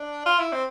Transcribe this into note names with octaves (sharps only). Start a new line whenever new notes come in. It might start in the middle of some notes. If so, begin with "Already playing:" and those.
Already playing: D4
F4
E4
C4